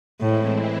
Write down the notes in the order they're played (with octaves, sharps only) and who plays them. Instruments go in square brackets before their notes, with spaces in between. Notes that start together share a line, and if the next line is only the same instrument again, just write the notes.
[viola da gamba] A2 [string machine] E3 G#3 C4 E4